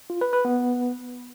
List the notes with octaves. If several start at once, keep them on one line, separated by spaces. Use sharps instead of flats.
F4
B4
B4
B3